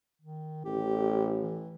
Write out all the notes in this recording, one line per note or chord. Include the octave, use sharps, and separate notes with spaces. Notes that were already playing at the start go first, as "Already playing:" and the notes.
D#3
A1 G4
E3